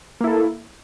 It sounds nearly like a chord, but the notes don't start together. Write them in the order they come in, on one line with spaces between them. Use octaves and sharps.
A#3 E4 A4